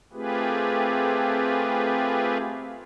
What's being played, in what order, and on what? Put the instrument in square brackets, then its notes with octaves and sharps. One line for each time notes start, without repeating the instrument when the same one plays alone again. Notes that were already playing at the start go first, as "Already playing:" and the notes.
[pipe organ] A3 C4 F4 G4 G#4 B4